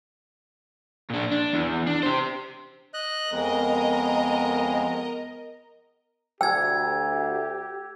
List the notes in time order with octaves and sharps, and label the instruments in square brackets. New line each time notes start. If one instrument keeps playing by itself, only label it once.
[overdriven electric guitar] A#2 D4
D4
E2 E3
D4
G4 C5
[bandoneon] D#5 F#6
[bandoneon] F2 G#3 [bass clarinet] B3 [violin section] A#4 D#5 A#5
[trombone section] D2 [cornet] G4 [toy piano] G5 [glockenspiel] E6 G#6